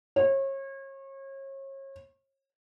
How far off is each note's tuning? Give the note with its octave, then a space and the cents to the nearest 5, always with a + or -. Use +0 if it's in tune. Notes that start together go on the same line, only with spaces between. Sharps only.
C#5 -35